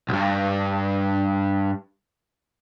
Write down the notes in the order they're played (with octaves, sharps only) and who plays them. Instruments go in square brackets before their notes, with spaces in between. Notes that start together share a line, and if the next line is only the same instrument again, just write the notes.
[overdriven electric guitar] B1 G2